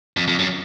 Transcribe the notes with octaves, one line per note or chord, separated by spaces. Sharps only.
F2
F2
F#2